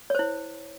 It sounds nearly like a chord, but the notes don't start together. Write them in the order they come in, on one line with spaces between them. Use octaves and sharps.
C#5 C5 E4